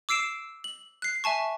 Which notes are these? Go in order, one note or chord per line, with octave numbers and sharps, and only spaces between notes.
D6 E6 C7 D7 E7
F#7
F#6 C7
E5 G#5 A5 C#6